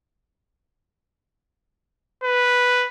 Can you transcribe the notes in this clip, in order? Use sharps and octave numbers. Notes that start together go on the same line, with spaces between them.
B4